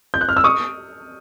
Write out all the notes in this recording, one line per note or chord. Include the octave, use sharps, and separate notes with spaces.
G6
F#6
F6
E6
C#6 D#6